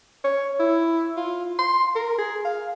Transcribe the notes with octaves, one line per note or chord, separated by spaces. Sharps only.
C#5
E4
F4
C6
A#4
G#4
F5